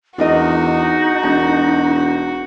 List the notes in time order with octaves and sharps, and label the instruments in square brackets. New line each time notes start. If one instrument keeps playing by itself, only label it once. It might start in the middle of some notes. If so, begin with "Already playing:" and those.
[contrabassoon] E2 [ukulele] D4 A#4 D#5 [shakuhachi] D#4 [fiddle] F#4
[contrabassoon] E1 [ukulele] A5